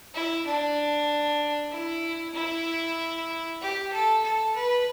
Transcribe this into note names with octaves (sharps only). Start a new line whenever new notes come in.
E4
D4
E4
E4
G4
A4
A4
B4